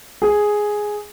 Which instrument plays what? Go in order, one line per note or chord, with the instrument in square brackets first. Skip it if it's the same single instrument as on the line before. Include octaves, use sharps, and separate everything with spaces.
[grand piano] G#4